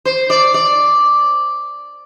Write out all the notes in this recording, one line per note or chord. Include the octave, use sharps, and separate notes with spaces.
C5
D5
D5